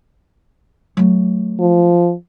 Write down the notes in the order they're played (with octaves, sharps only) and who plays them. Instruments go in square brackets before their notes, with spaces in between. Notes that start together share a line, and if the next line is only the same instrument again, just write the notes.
[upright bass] F#3 A3
[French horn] F3